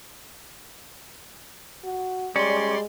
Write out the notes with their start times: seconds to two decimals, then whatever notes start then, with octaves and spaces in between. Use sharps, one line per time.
1.84 F#4
2.36 G3 G#3 C#4 D5 C6